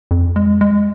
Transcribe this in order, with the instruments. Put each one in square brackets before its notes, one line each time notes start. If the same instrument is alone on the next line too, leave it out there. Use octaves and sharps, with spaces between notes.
[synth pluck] F2
G#3
G#3